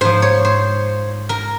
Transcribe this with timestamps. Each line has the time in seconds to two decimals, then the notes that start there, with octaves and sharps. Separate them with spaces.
0.01 G#2 F3 C5
0.22 C#5
0.45 C5
1.29 A#4